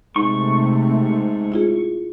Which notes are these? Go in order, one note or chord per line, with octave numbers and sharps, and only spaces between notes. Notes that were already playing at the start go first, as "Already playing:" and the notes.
G#2 C3 A3 C#6
E4 F4 G#4